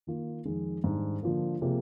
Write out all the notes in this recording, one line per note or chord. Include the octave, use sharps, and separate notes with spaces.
D#3 A#3 F4
F2 D#3 G#3 D#4
G#2 D#3 G3 D4
D3 F3 A#3
C3 F3 A#3 F4 G#4